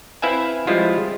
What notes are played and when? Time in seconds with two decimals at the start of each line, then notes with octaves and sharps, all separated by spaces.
0.22 C4 E4 B4 E5 F5 G#5
0.67 F3 G3 G#3 E4 F4